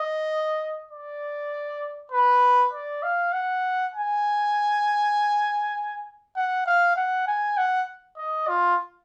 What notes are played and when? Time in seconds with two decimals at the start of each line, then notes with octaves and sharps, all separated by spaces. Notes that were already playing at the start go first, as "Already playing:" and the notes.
Already playing: D#5
0.91 D5
2.12 B4
2.73 D5
3.03 F5
3.33 F#5
3.94 G#5
6.36 F#5
6.66 F5
6.96 F#5
7.27 G#5
7.57 F#5
8.17 D#5
8.48 F4